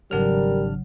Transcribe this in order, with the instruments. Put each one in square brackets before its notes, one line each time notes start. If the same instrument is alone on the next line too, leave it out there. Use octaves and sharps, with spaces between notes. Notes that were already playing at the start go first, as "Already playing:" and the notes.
[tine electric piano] G#1 D4 F6 [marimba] C#3 F#3 [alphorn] G3 [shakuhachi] A#4